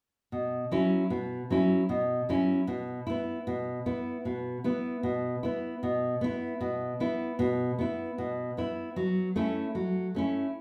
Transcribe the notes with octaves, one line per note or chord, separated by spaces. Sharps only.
B2
F#3 C#4 E4
B2
F#3 C#4 E4
B2
F#3 C#4 E4
B2
B3 E4
B2
B3 E4
B2
B3 E4
B2
B3 E4
B2
B3 E4
B2
B3 E4
B2
B3 E4
B2
B3 E4
F#3
A3 C#4 E4
F#3
A3 C#4 E4